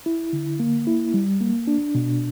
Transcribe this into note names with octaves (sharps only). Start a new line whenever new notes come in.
E4
D3
A#3
E4
G3
A#3
D4
B2